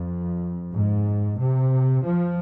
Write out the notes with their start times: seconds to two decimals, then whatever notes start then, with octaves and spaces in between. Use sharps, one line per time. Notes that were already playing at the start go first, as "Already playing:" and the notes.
Already playing: F2
0.73 G#2
1.38 C3
2.04 F3